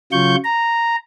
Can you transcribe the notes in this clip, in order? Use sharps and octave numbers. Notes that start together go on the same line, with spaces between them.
C#3 F#3 F4 C#6 G6
A#5